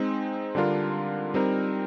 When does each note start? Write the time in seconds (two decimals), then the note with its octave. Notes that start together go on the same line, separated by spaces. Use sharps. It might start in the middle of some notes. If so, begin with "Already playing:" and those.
Already playing: G#3 C4 D#4
0.55 D3 G3 D4 F4 A#4
1.34 G3 C4 D#4 A#4